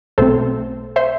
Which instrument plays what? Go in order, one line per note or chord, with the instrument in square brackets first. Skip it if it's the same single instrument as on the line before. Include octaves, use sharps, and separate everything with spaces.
[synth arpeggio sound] B1 B2 A3 C4 A4 C5
C5 E5